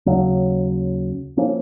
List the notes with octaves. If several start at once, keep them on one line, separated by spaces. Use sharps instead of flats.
D#2 C#3 F#3 C#4
F3 A#3 C#4